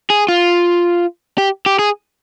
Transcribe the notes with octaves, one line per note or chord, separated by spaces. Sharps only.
G#4
F4
G4
G4
G#4